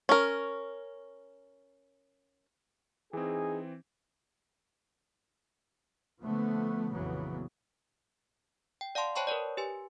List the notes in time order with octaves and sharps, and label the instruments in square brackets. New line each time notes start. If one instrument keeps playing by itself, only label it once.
[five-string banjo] C#4 A#4
[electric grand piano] E3 C4 [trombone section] D#4 G#4
[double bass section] D3 F3 A3 B3
A#1 F2 C#3 E3 F#3 B3
[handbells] G5
D5 F5 F#5 A5 C6
C5 C#5 G5 A5 B5 C#6
A#4 B4 C#5 D5
G4 B4 G#5